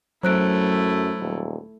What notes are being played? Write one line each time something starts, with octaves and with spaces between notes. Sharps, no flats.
F#2 F#3 A3 E4 C5 F#6 D7
D#1